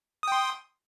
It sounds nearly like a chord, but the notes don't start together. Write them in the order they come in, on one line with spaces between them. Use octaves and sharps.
D#6 G5 C6